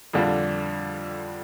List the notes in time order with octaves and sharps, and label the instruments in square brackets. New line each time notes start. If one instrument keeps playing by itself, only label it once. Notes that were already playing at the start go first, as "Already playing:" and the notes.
[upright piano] F2 D3 G3 D4 F4